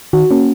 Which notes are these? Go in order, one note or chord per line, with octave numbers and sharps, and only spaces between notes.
D#3 F#4
A#3 C#4